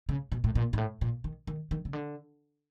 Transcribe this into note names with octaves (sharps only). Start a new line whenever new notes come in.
C#3
B2
A2
A#2
G#2
A2
A#2
D#3
D#3
D#3
C#3
D3